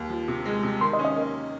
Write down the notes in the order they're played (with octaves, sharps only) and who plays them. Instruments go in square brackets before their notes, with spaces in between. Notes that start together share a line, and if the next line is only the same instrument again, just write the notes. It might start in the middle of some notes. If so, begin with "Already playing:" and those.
Already playing: [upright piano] D#2
F3
C3
G#3
C3
[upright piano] D#3 [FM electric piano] C6
[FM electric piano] D#5
[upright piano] C#4
[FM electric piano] D#5
[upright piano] A#3